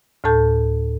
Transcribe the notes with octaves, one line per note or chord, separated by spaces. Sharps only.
D2 A2 A4 A5 G6